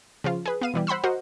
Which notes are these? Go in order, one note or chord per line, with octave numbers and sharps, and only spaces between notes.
C#3 F3 F4
G#4 B4
B3 F5 D#7
B2 E3 G3
C5 F#5 B5 C6 E6
F#4 A#4 C5 D#5 F#5